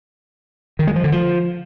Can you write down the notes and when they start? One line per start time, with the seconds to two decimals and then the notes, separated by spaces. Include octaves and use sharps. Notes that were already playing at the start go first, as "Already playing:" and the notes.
0.79 D#3
0.87 G#3
0.96 F3
1.04 D3
1.12 F3